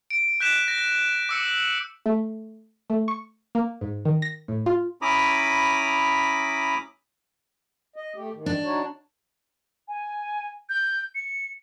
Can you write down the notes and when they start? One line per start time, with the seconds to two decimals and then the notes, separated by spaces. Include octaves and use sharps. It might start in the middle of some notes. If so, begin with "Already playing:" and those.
0.10 D7
0.40 F#6 G6 B6 D7 E7
0.68 A#6
1.29 D6 E6 C#7
2.06 A3
2.90 A3
3.08 C#6
3.55 A#3
3.81 G#2
4.05 D#3
4.22 A#6
4.48 A2
4.66 F4
5.02 C#4 E4 A#5 B5 D6 D#6
7.96 D#5
8.16 A3 G4
8.33 G#2 D#3
8.46 D4
8.64 D#4 F#4 C#5
9.88 G#5
10.69 G6
11.15 C#7